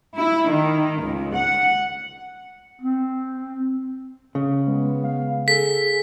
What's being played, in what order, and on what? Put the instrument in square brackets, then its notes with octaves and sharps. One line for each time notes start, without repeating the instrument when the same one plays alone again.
[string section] E4
D#3
C#2
F#5
[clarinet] C4
[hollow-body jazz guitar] C#3
[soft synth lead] G#3 [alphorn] B3
[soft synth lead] F5
[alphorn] G#4 [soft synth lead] A4 [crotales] B6